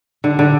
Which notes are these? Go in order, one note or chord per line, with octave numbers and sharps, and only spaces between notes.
D3
D3